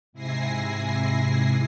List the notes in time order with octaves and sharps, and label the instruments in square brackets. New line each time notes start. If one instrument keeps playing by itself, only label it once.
[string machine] G#2 C3 E4 G#5 A#6 C7